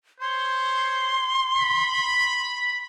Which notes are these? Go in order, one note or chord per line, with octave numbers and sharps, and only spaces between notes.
C5 C#5 C6
B5